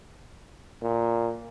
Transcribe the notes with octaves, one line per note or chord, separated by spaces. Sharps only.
A#2